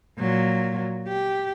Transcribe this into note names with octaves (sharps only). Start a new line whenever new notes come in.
A#2 F#3
G4